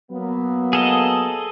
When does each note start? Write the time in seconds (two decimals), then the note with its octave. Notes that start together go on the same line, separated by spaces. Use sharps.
0.11 F#3 A#3 B3
0.73 G#4 A4 D#5